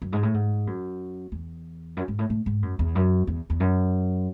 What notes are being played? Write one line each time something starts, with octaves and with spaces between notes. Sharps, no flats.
F#2
G#2
A2
G#2
F#2
E2
F#2
G#2
A2
A2
G#2
F#2
E2
F#2
E2
E2
F#2